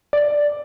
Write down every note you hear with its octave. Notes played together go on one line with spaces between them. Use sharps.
D5